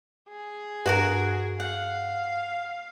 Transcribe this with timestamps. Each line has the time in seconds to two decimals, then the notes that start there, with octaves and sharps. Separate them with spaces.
0.29 G#4
0.86 G2 F#4 G4 A#4
1.60 F5 F#5